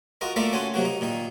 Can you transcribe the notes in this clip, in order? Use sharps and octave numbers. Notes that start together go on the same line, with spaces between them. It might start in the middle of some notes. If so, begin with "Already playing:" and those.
F4 F#4 A#4 D#5
A3 A#3 F4 A#4 D5 E5
C#4 F#4 A4 G#5 C6
C3 F#3 A#3 F#4
D#4
A#2 D#3 D#4